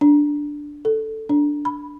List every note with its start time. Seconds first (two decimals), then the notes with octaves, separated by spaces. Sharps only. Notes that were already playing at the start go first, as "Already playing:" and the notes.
0.01 D4
0.85 A4
1.29 D4
1.65 B5